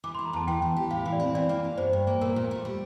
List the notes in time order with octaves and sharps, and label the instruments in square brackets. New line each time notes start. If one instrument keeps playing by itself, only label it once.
[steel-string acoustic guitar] E3 [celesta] D6
[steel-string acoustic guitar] A3 [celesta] C6
[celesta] A#5
[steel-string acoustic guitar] E2 [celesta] A5
[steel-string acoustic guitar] E3 [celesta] G5
[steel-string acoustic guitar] E3
G4
[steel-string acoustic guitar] A2 [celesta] F5
[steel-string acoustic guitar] E3
[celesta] D5
[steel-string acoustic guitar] C4
[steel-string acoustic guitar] E3 [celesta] D5
[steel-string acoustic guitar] A#3
A#3
[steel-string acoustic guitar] G2 [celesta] C5
[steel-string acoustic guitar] G2
A#3
[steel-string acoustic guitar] A#2 [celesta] A#4
[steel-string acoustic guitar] A#2
A3
G3